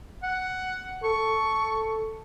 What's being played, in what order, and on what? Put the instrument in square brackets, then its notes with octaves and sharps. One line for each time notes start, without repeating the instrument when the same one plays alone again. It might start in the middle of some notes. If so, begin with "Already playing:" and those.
[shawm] F#5
[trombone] A4 [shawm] C#6